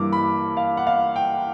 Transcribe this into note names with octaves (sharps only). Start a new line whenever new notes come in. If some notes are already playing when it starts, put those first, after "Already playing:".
Already playing: G2 E3 G3 A#3 D6
B5
F5
F#5
F5
G5